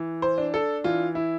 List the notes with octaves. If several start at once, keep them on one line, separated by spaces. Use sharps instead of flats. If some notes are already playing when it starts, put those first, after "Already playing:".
Already playing: E3
C5
D4
A4
E3 F4
E4